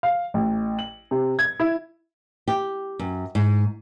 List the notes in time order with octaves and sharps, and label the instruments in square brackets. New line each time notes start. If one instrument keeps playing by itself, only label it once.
[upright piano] F5
A1
F#7
C3
G#6
E4
[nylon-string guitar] G4
F#2
G#2